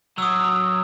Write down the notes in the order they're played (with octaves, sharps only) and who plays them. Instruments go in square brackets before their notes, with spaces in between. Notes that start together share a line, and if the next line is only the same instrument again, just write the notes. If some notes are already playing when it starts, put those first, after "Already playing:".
[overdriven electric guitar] F#3 [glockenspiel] D#6 E6